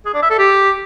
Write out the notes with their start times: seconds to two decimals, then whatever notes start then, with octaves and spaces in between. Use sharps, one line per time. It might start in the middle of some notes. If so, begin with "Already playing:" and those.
0.06 G#4
0.14 D4
0.22 E5
0.31 A4
0.39 G4